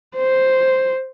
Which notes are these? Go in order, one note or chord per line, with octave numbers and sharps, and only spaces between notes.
C5